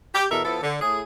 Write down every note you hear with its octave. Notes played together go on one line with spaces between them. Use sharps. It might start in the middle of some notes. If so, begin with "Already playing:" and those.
G4
E2 B2 A4 A#4 E5
F3 B3 E4 A4
D3
A2 G#4